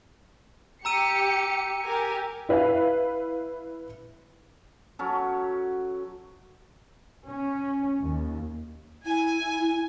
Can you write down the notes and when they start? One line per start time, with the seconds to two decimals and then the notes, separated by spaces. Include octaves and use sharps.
0.85 G4 A#5 E6 C#7 D#7
1.84 G4 A#4 G#5
2.49 E4 B4 E5 F5
4.99 F#3 C#4 A4
7.27 C#4
7.99 D#2
9.06 E4 G#5